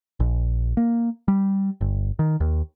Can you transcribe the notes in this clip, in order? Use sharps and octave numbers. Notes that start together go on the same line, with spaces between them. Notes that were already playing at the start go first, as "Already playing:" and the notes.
A#1
A#3
G3
G1
D#3
D#2